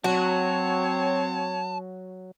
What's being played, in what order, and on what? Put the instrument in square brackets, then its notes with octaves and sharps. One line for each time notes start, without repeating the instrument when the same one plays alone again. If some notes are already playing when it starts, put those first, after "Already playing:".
[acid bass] F#3 [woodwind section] C4 C#5 [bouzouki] F#4 [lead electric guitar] A5